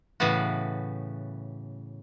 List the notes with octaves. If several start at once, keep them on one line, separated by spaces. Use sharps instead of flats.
A2 C#3 E3 B3 F#4